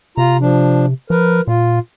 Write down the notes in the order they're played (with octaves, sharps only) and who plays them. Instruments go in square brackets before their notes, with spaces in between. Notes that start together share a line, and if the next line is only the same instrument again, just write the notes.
[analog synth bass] C3 [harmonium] F4 A#5
[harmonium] F3 D4
[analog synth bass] F3 [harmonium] A#4 B4
[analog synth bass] A#2 [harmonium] F4